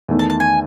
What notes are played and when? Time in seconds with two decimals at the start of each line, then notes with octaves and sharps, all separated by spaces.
0.08 E2 D#3 A3
0.19 A5
0.30 A5
0.40 G#5